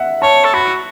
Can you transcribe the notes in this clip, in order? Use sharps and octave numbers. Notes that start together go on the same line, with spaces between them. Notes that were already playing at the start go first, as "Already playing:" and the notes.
Already playing: E5 F#5
C#5 A5
A4
F#4 B5